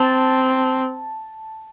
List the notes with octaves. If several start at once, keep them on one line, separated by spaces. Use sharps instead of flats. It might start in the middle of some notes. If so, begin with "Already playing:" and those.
Already playing: C4 A5